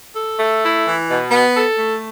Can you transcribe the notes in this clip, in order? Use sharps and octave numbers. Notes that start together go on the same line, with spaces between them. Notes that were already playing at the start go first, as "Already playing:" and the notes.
A4
A3
E4
E3
B2
B3
A4
A3